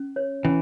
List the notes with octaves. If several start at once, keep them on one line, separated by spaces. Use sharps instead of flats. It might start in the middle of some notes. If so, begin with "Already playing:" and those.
Already playing: C#4
C#5
E3 C#4